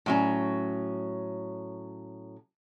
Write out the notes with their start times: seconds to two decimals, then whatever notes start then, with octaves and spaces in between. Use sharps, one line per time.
0.06 A2 F#3 C#4